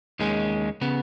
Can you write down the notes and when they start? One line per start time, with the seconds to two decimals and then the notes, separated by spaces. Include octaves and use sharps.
0.19 D#2 D#3 G#3 C#4
0.81 C#3 B3